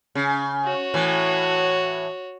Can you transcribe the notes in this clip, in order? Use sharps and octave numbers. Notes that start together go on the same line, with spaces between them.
C#3
F#4 C#5
A2 E3